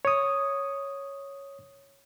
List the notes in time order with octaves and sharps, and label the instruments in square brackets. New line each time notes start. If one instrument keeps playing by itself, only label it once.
[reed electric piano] C#5 D#6